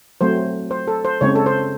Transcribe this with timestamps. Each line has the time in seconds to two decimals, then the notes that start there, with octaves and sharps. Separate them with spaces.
0.21 F#3 A3 C4 C5
0.71 C5
0.88 A4
1.05 C5
1.21 C#3 G#3 C4 C#5
1.36 A4
1.46 C5